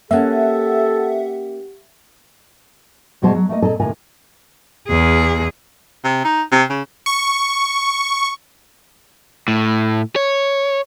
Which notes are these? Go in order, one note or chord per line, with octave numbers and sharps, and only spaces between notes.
A#3 C#4 G4 A4 E5 F#5
E2 B2 G3 G#3 C5 A5
F#3
A3 A#3 D#5
A#2 C4 A4 D#5 A5
D#2 A2 C3 F4 A#4 G#5
E2 G#4
C3
D#4
C3
C#3
C#6
A2
C#5